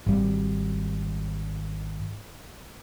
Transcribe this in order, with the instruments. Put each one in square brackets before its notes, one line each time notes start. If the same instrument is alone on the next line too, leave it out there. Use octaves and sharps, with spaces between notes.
[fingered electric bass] G#1 G3